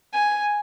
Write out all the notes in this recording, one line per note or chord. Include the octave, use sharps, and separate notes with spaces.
G#5